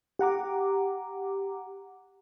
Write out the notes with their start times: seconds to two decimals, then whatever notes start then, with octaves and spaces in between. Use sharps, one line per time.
0.19 G4 F#5 A#5 D6